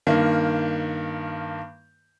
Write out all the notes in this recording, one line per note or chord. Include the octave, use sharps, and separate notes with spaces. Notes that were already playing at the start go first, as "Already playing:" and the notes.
G2 D#3 A#3